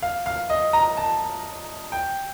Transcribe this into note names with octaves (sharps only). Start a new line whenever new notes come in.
F5
F5
D#5
A#5
A5
G5